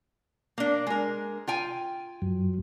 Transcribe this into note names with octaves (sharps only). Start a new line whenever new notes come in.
A#3 D4
G#3 A#4
F4 G5 G#5
F#2 F#3